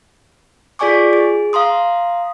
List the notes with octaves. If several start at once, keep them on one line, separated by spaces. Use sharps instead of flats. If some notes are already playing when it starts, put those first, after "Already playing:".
F4 G#4 D5 G#5 C#6 D6
G#4
F5 A#5 C6 D#6